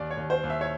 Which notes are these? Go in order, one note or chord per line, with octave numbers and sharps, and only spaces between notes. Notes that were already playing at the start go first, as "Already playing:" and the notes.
Already playing: D#2 D5
C#5
D#2
C5
D#2
E5
C#5